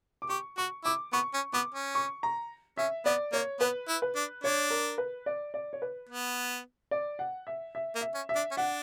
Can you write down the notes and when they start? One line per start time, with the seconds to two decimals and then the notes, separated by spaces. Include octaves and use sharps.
0.22 D6
0.29 G4 C#6
0.58 F#4 C#6
0.84 E4 D6
1.13 B3 C#6
1.34 C#4
1.53 B3 D6
1.74 C#4
1.95 C#6
2.23 A#5
2.77 C#4 E5
3.06 B3 D5
3.33 A#3 C#5
3.60 B3 B4
3.88 E4
4.02 B4
4.16 D4
4.44 D4 C#5
4.70 A#4
4.98 B4
5.26 D5
5.54 D5
5.73 C#5
5.82 B4
6.09 B3
6.91 D5
7.19 F#5
7.47 E5
7.75 E5
7.95 A#3
8.01 E5
8.15 C#4
8.29 E5
8.36 D4
8.51 C#4
8.57 D4 F#5